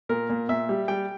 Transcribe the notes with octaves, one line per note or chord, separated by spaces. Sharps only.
A#2 A#4
A#2
A#2 E5
G3
G3 G5